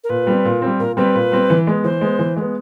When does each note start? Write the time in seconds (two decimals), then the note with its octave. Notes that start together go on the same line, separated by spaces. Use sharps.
0.04 A#4
0.09 A#2 B4
0.27 G3 C4
0.45 A#2
0.62 G3 C4
0.79 A#2 A#4
0.97 G3 C4 B4
1.15 A#2
1.32 G3 C4
1.50 E3
1.67 G#3 B3
1.84 E3 C5
2.01 G#3 B3
2.19 E3
2.36 G#3 B3